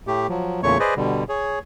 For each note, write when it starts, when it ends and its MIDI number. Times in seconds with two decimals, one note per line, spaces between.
0.07 0.27 45
0.07 0.27 57
0.07 0.27 67
0.29 0.61 53
0.29 0.61 54
0.63 0.78 40
0.63 0.78 46
0.63 0.78 49
0.63 0.78 57
0.63 0.78 73
0.63 0.78 85
0.80 0.94 68
0.80 0.94 71
0.80 0.94 72
0.80 0.94 74
0.80 0.94 75
0.96 1.24 47
0.96 1.24 50
0.96 1.24 55
1.29 1.59 68
1.29 1.59 73